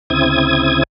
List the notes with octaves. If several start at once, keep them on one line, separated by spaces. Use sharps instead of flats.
D2 C#3 C4 E4 D#6 G#6